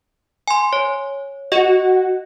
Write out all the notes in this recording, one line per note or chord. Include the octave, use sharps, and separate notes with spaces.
G#5 C6
C#5
F#4 D#5